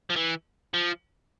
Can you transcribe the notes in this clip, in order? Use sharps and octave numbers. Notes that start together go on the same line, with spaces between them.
F3
E3
F3